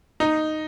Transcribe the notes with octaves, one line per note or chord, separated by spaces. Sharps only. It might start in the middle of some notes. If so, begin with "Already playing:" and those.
D#4